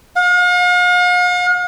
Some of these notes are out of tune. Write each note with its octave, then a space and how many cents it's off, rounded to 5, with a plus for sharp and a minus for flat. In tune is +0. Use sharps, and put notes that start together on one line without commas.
F5 +45